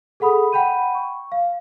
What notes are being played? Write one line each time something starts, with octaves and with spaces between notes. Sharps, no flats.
G#4 A4 F#5 B5 D#6
F#5 G5 B5 G6 D#7
C#6
F5